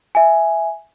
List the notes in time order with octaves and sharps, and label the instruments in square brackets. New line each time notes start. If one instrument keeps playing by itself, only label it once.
[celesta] E5 G#5